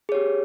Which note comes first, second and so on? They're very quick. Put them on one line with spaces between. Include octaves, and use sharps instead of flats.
G#4 C#5 G4